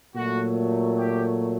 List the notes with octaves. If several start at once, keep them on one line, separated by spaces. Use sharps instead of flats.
A#2 F#3 A3 F#4
G4